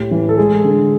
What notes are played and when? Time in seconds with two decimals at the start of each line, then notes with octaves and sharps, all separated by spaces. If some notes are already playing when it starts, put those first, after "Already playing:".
Already playing: A2 G4
0.11 E3
0.29 A4
0.38 G#3 G#4
0.64 D3